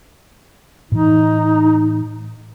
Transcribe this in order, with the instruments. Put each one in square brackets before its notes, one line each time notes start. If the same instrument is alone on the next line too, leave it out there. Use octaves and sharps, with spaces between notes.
[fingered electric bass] A2 E3 [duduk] D#4